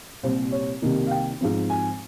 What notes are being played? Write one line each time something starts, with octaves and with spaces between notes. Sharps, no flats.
C2 A#2 G3 C4 C5
C#5
C2 C3 D#3 A#3 D#4
F5
G5
G#2 F3 C4
G#5